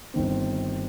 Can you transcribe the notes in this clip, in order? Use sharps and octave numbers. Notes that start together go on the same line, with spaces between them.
G1 D#3 C4